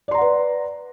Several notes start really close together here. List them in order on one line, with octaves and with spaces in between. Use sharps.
D5 C6 A#5 F#5 B4